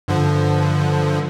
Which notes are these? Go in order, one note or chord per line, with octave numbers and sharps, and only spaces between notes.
G2 D3 F3